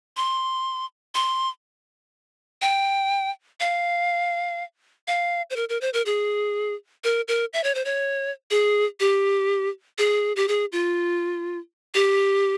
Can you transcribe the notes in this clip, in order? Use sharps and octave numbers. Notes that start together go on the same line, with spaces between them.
C6
C6
G5
F5
F5
C5
A#4
A#4
C5
A#4
G#4
A#4
A#4
E5
C#5
C5
C#5
G#4
G4
G#4
G4
G#4
F4
G4